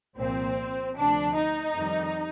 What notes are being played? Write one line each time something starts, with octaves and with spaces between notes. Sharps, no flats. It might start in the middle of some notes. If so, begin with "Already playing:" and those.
C2 A#2 F3 C4
D2 C3 F3 D4
D#4
F2 D#3 G3